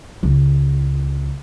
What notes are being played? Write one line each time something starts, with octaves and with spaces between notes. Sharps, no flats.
C#2